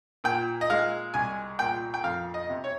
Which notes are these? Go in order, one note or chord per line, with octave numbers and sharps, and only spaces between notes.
A#2 G5
D#5
G#3 F5
C2 G#5
A#2 G5
G5
F2 F5
D#5
C3
C#5